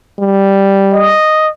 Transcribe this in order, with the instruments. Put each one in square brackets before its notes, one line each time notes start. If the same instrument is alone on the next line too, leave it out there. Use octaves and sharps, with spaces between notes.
[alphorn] G3
[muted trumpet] D#5